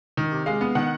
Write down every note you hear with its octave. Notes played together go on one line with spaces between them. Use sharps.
D#3
C3
G#3 F5
B3
D#3 F#5